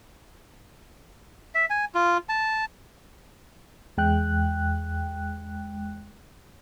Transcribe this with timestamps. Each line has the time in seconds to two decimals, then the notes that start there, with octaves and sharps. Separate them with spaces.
1.55 E5
1.70 G#5
1.95 F4
2.29 A5
3.97 E2 G#3 G5 F#6